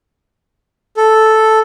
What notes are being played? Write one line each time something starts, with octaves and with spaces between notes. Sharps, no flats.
A4